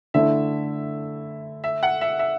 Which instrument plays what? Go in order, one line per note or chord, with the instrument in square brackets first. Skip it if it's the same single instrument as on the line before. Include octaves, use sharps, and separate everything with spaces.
[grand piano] D3 A3 E4 [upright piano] E5
[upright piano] E5
F#5
E5
E5